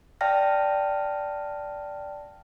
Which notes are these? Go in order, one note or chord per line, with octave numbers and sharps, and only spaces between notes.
D5 F5 G5 A5 F6 A#6